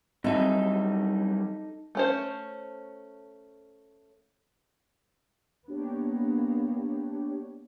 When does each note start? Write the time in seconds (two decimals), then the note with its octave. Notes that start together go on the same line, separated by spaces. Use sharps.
0.24 F#2 E3 G3 C4 D#4 A4 E5
1.95 A3 C#4 C5
5.68 A#3 B3 D4 G4 C#5